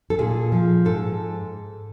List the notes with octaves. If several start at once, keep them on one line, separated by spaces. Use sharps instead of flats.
A4
A#2 G#4
F3
G#2 A4